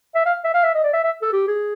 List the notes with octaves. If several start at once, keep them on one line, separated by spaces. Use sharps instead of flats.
E5
F5
E5
F5
E5
D#5
D5
E5
E5
A4
G4
G#4